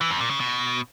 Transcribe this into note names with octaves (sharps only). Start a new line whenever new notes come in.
E3
F2
A#2
C#3
B2